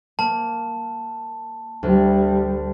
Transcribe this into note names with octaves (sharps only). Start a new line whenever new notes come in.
A#3 A5
D2 G3